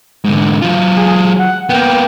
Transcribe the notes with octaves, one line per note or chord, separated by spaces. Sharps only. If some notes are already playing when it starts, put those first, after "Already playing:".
G#2 D3
F#3 F4
G#4
F#5
A#3 B3 G5